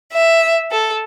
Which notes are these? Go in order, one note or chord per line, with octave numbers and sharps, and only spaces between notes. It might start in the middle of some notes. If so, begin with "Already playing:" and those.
E5
A4